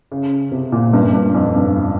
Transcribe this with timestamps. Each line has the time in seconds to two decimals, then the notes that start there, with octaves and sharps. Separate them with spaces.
0.12 C#3
0.52 C3
0.72 A#2
0.93 G2
1.13 G2
1.35 F2
1.56 G2